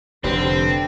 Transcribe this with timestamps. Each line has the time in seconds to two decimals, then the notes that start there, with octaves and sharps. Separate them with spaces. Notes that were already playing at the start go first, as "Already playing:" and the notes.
0.24 F1 D3 C4 G4 B4 C5